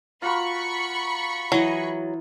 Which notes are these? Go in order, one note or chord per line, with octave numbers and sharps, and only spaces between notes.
F4 F#4 A#4 B5 C#6
E3 F#3 D#5